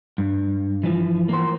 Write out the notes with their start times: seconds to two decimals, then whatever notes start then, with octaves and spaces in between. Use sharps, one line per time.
0.18 G2
0.83 E3 F3
1.29 A#3 C5